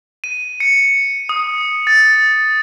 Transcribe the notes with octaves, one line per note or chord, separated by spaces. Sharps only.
D#7
C#7
D#6
A6